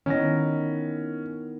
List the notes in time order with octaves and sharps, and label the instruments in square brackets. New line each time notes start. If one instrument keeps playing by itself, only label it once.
[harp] D#3 B3 E4 [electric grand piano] C#4 A#6